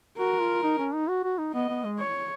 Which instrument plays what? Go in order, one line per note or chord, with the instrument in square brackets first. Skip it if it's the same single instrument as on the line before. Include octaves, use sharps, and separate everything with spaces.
[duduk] F#4 [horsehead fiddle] A#4
[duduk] F4
D#4
C#4
D#4
F#4
F#4
D#4
[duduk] B3 [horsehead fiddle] D#5
[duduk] B3
G#3
[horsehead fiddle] C#5